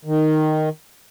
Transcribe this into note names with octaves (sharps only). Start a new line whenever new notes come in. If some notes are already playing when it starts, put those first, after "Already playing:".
D#3